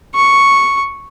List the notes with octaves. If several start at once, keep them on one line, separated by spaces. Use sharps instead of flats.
C#6